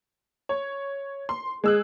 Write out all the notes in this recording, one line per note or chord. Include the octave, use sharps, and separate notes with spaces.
C#5
C6
G#3 G#4 E6 F#6